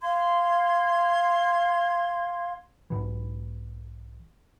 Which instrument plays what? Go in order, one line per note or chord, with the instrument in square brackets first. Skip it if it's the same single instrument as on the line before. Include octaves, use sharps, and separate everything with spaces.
[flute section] F5 C6 G#6
[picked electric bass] B1 G#2 B2 E3